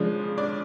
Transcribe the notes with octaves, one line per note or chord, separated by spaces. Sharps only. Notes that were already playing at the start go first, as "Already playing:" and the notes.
Already playing: C#3 F3 G#3 D4
D4 D5